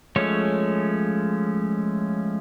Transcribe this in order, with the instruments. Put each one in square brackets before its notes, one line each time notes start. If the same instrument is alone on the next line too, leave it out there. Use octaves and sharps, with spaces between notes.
[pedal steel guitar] F3 G#3 A3 C#4 C#5